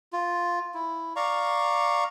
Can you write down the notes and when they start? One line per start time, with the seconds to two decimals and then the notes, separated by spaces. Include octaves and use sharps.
0.13 F4
0.74 E4
1.16 D5 F5 A#5 C#6